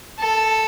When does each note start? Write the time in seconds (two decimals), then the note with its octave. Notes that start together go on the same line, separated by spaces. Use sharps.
0.20 A4